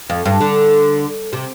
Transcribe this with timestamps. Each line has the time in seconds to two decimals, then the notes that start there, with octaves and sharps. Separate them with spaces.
0.10 F2
0.25 G2
0.40 D3
1.33 C3